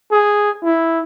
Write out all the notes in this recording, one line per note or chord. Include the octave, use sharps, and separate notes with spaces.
G#4
E4